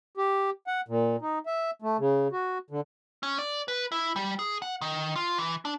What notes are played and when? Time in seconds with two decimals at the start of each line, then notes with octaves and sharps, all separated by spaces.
0.17 G4
0.67 F#5
0.88 A#2
1.21 D#4
1.46 E5
1.82 A3
1.99 C#3
2.32 F#4
2.70 D3
3.23 C#4
3.39 D5
3.68 B4
3.92 E4
4.16 G3
4.39 G#4
4.62 F#5
4.81 D#3
5.16 F4
5.38 E3
5.65 D4